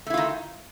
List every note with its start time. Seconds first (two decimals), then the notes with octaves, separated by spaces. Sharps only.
0.06 A3
0.10 E4
0.14 F4
0.17 D#3